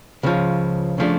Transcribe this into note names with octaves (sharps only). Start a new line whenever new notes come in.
C#2 C#3 F3
C#3 F3 A3 D4